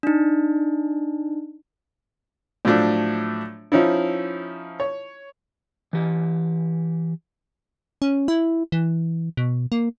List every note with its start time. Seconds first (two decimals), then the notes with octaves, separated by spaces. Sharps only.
0.03 D4 D#4
2.65 A2 F3 F#3 A3 D4
3.72 F3 C#4 D#4 E4
4.80 C#5
5.93 E3 G4
8.02 C#4
8.28 E4
8.72 E3
9.37 B2
9.72 A#3